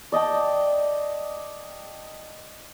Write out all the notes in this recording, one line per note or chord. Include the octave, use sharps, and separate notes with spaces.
D5 D#5 G5 A5